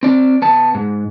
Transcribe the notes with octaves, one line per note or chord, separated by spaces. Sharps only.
C4 D5
B3 A5
G#2